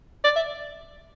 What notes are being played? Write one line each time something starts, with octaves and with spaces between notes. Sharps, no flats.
D5
E5